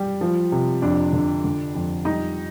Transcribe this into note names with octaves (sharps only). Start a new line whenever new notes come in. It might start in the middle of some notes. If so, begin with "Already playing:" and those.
Already playing: G3
F3
C3
F2 D4
D3
D3
F2
G3 D#4